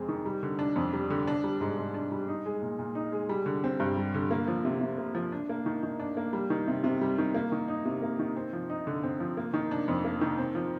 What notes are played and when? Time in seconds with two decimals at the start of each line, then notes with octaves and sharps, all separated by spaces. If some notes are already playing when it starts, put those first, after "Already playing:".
Already playing: F2 G#3 C4
0.09 D#3
0.25 G3
0.43 D3
0.59 D4
0.76 F2
0.93 G3
1.10 D3
1.27 D4
1.44 G3
1.61 G#2
1.78 G#2
1.94 D4
2.12 G3
2.28 D#4
2.46 G#3
2.62 A#2
2.79 A#2
2.95 D#4
3.12 G#3
3.29 G3
3.46 D3
3.64 C4
3.80 G2
3.97 G3
4.14 D3
4.31 A#3
4.48 F3
4.65 C3
4.81 C3
4.98 A#3
5.15 F3
5.32 D4
5.49 A#3
5.66 D#3
5.83 D#3
6.00 D4
6.17 A#3
6.33 G3
6.50 D#3
6.67 C3
6.84 C3
7.01 G3
7.18 D#3
7.34 A#3
7.52 D#3
7.68 D#4
7.85 C3
8.02 A#3
8.19 D#3
8.36 C4
8.53 F3
8.70 D#4
8.87 D3
9.03 C4
9.20 F3
9.37 A#3
9.54 D#3
9.71 D4
9.88 F2
10.04 A#3
10.21 D#3
10.38 C4
10.55 F3